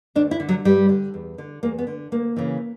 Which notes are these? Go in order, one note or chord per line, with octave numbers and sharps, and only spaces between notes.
D2 D4
E4
D3
F#3
G2 G3
D3
E2
D3
E2 A#3
B3
D3
D2 A#3
C#3 E3